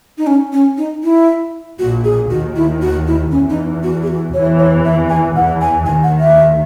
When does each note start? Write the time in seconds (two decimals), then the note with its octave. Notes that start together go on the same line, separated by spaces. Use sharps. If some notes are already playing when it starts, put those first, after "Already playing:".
0.18 D#4
0.27 C#4
0.53 C#4
0.77 D#4
1.04 E4
1.79 A#1 A#2 F#4
2.04 G#4
2.30 D#2 D#3 F#4
2.56 E4
2.82 F#4
3.07 E4
3.31 E2 E3 C#4
3.50 D#4
3.83 F#4
4.02 G#4
4.08 F#4
4.33 E2 E3 C#5
4.59 C#5
4.85 E5
5.09 G#5
5.35 E2 E3 F#5
5.61 G#5
5.86 D#2 D#3 G#5
6.03 F#5
6.20 E5